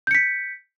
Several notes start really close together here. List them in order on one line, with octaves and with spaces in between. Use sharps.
G6 C#7 B6